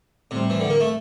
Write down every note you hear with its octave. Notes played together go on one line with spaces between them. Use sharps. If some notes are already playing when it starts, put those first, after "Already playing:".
A2 C3 G3 C4
E3
D3
A#3
A3